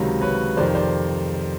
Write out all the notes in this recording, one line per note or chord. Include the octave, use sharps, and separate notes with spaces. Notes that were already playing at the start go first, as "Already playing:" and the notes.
Already playing: C#2 C3 D#3 F#3
B4 C#5
F2 C3 D#3 C5 D5
C5 D5